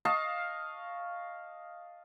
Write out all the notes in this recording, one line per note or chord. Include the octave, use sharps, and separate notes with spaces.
D#5 F5 A5 C#6